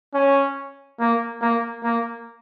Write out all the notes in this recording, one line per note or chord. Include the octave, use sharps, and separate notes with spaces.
C#4
A#3
A#3
A#3